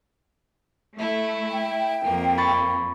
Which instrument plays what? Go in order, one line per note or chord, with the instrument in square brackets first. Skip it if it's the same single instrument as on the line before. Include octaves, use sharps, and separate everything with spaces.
[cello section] A3 [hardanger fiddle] E4
[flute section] G5
[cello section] F2 [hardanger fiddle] A#3
[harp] B5 C#6 A6